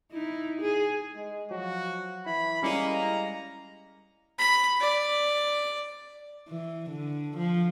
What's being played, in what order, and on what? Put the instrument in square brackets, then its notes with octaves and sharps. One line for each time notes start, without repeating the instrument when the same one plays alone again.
[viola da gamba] D#4 E4
G#4
[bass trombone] G#3
[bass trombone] F3 [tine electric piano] F#3 [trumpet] F#4
[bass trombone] E3 [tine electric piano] E4 [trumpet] B5
[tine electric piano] G3 F5 C#7 [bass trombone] G#3 [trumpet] A#3 [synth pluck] C#4 E4 D#7
[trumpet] A#5
[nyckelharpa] B5
D5
[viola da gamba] E3
D3
F3